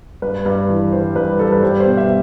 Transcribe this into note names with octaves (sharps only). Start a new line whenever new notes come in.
G2 B4
G2
E3
G3 C5
G2 B4
G2 A4
B4
G3 C5
C5
B2
E5